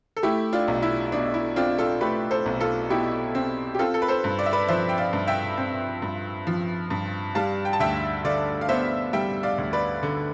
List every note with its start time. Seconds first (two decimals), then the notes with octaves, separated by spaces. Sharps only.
0.17 A4
0.23 A3 E4 G4
0.53 D4 F4
0.68 B1
0.82 E4
1.12 B2 D4
1.34 E4
1.56 C4 D4 F4
1.79 F4 A4
2.01 A3 G4 B4
2.31 A4 C5
2.46 B1
2.61 F4 A4
2.90 B2 E4 G4
3.35 C4
3.75 G4
3.79 C4 F4 A4
3.94 A4
4.02 B4
4.09 A4 C5
4.24 G2
4.39 D5
4.46 E5
4.53 B4 D5
4.68 F3 C5 E5
4.89 G5
4.98 D5 F5
5.13 G2
5.28 E5 G5
5.58 C4
6.02 G2
6.47 F3
6.90 G2
7.35 G3 F5 A5
7.65 G5
7.73 A5
7.80 D2 E5 G5
8.24 D3 D5 F5
8.61 F5
8.69 B3 C5 E5
9.13 G3 E5 G5
9.43 D5 F5
9.58 D2
9.73 B4 D5
10.03 D3